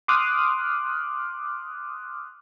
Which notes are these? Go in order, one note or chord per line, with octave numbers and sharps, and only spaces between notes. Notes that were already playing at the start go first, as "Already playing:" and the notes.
C6 D6 D#6 F6 F#6